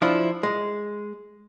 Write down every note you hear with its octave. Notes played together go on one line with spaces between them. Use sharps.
F3 D4 E4 F4
G#3